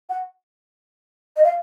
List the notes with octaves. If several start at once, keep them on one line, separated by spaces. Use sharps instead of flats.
F#5
D#5
F5